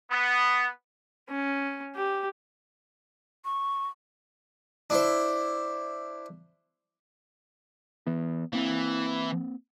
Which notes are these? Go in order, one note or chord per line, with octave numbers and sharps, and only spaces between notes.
B3
C#4
G4
C#6
D4 E4 C5
E3 B3
E3 A#3 C4